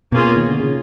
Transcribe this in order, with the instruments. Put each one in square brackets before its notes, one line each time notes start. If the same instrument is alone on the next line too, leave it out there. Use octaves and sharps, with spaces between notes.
[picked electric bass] B2 [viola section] A#3 C#4 F4 G#4
[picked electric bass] D#3
D3
C#3